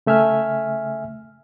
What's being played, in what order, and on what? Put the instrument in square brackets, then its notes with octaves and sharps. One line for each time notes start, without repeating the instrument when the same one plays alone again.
[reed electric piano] C#3 A3 E5 G#5 F6